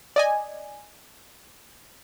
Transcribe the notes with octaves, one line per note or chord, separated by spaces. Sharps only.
D5 D#5 G#5